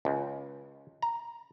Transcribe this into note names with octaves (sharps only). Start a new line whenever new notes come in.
C#2
A#5